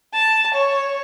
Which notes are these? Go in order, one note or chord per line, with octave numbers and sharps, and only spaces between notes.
A5
C#5